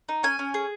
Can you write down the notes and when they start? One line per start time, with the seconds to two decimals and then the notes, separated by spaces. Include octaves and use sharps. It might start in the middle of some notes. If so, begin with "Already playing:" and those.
0.09 D#4
0.23 C#4 G#5
0.39 C#4
0.54 G#4